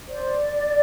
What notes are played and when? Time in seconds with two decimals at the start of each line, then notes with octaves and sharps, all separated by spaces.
0.09 C5 D5